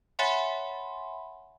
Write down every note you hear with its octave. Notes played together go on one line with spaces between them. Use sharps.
C#5 E5 F#5 G#5 B5 C6